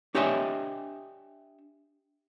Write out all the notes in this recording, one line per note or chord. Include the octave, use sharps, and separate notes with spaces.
D4 G4 C#5 D#5 E5 G#5